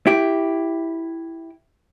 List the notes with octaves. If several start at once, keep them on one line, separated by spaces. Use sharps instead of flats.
E4 G4